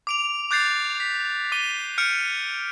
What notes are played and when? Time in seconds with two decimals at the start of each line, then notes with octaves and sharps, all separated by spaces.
0.07 D6 D7 F7
0.51 D6 F#6 G6 A6 C7
1.00 B6
1.52 D6 D#7 G7
1.98 F6 G6 C#7 D7